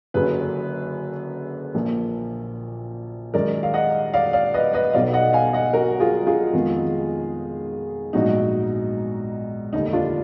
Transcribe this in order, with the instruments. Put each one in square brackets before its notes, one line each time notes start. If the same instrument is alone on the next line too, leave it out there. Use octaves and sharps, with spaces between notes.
[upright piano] F#1 F#2 D3 F#3 G#4 B4
A#1 A#2 F3 A#3
F#2 D#3 G#3 A#4 D5
F5
D#5 F#5
D5 F5
D5 F5
B4 D#5
B4 D#5
B1 B2 F#3 D5 F5
D#5 F#5
F5 G#5
D#5 F#5
F#4 A#4
F4 G#4
F4 G#4
F2 D#3 G#3 B3
A#1 G#2 F#3 B3 D#4 F#4
F1 D#2 D3 D#4
D4 F4